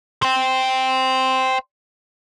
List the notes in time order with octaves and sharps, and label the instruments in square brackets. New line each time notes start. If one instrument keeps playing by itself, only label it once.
[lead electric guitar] C5 G5